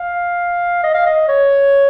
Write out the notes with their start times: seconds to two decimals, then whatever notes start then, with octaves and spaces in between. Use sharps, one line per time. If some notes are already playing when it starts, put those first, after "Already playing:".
Already playing: F5
0.83 D#5
0.94 F5
1.06 D#5
1.28 C#5